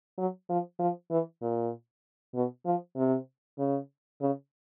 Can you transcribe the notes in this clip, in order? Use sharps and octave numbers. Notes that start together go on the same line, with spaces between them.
F#3
F3
F3
E3
A#2
B2
F3
C3
C#3
C#3